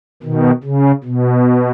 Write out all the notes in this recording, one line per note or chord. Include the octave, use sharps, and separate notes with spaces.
B2 D#3
C#3
B2